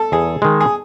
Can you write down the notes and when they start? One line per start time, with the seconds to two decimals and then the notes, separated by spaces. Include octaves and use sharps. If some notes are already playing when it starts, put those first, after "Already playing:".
Already playing: A4
0.12 E2 G#4
0.42 D#3 G#3
0.61 G#4